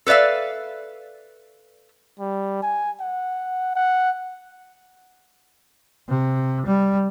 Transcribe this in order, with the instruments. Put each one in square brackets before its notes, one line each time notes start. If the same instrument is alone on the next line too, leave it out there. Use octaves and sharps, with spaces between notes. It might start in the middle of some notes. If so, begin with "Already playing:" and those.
[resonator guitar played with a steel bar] A4 B4 D5 E5 F5
[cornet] G3
G#5
F#5
F#5
[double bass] C3
G3